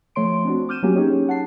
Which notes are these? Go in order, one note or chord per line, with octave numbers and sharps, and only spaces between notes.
F3 A3 C#5 C6 D7
C4 D4 F#4
D6 F6 G6 D#7 E7
F#3 A#3 C#4 F#4 G4
C#4 D#4 G4 G#4 C#5
F#5 A5 C7